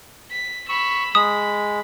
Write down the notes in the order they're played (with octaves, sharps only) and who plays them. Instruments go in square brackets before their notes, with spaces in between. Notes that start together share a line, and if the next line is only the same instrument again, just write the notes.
[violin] B6
[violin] B5 E6 [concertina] C#6
[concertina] G#3 [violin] B5 [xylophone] D#6